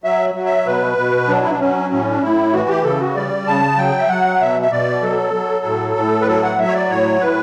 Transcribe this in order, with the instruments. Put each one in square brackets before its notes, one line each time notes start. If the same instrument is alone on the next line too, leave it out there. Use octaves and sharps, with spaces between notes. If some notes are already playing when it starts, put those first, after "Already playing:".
[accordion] F#3 E5
F#3
E5
B2 B4
B2
F#3 D4
E4
D4
F#3 C#4
A2 C#4
D4
A2 E4
E3 F#4
G4
C#3 A4
F#4
G3 D5
C#3 A5
F#3 G5
E5
F#3 F#5
B2 E5
E5
B2 D5
F#3 A4
F#3
A2
A2
B4
F#3 A4
F#5
F#3 E5
C#5
D5
A2 C#5
A2 B4